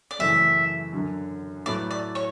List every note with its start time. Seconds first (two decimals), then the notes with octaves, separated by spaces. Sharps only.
0.11 D5
0.19 F#2 C#3 E3 A3 E4 E5
0.93 F#2 D3 F#3
1.66 A2 F#3 A3 E4 B4 D5
1.91 D5
2.15 C#5